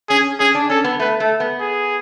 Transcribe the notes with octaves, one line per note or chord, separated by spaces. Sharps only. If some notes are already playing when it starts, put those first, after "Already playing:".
C#4 G#4
C#4 G#4
D4
C#4 A4
B3
A3 B4
A3
B3
G#4